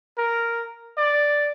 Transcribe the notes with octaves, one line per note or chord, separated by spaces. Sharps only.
A#4
D5